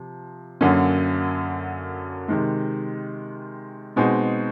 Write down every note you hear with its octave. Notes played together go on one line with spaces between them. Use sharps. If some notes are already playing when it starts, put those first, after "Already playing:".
Already playing: C3 F3
F#2 D3 F#3 A#3 C#4
C3 D#3 G#3
B2 G#3 C4 D#4 G#4